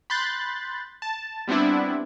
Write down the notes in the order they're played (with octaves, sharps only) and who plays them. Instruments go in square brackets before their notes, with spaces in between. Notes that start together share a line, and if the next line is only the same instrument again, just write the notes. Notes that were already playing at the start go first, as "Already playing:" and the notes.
[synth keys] B5 C6 F#6 G6 A6
A5
G3 B3 C4 D4 E4